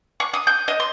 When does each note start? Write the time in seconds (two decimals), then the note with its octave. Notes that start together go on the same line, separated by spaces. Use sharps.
0.20 C#6
0.34 D#6
0.47 G6
0.68 D#5
0.80 C6